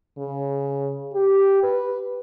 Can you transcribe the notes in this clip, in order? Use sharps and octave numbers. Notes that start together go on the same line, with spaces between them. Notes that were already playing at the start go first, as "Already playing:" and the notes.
C#3
G4
B4